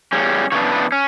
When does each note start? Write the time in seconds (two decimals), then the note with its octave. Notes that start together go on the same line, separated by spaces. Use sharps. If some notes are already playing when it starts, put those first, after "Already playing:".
0.12 E2 C#3 G3 C#4
0.52 C#3 E3 B3 D4 C#5
0.72 B4
0.92 C#4